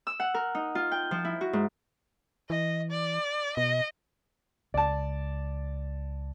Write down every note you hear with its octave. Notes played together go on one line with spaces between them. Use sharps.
E6
F#5
A#4
D#4
F4
G5
F3
E4
F#4
G#2
E3 D#5
D5
B2 D#5
C#2 D5 A5